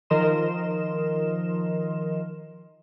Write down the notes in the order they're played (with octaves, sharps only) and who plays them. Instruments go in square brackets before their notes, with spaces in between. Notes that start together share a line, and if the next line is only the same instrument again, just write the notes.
[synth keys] D#3 F3 A#4 D#5 C6 E7